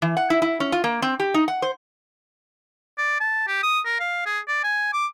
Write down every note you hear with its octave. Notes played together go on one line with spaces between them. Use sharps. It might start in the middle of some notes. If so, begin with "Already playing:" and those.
E3
F#5
E4
E4
C#4
F4
A#3
C4
G4
D#4
F#5
C5
D5
A5
G4
D#6
A#4
F5
G#4
D5
G#5
D6